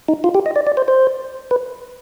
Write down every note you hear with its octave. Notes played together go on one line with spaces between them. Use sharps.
D#4
F4
G4
D#5
D5
D5
C5
C5
B4